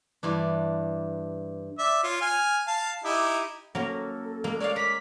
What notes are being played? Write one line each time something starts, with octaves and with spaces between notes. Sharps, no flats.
G2 E3 D4
D5 E5
F4 C#5
G#5 F6
F5 A5
D#4 E4 G4
F#3 A#3 C#4 A4
G#3 A#3
C#5 D5 F5
A#4 D6 B6